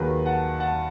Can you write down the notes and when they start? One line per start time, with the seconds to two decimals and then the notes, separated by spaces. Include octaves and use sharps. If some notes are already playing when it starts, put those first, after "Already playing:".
Already playing: D#2 D#3 F#3 G#4 B4
0.26 F#5 A5
0.60 F#5 A5